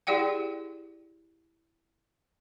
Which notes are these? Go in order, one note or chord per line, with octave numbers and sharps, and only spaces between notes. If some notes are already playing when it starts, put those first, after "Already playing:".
E4 G4 G#4 D5 F#5 G5